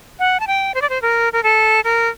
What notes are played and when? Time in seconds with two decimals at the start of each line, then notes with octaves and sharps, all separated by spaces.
0.19 F#5
0.40 A5
0.47 G5
0.74 C5
0.82 D5
0.90 C5
1.02 A#4
1.33 A#4
1.43 A4
1.84 A#4